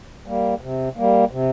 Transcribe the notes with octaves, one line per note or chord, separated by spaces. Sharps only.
G3 A#3
C3
G3 A#3
C3